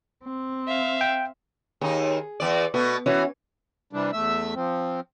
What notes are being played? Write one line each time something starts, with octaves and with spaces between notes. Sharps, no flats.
C4
E5 F5
G5
D#2 D#4 G#4
E2 D5
B2 A3 B3
E3 C#4 E4 F#4
C3 E3 G3 D4
E2 A3 E5 E6
F3 C4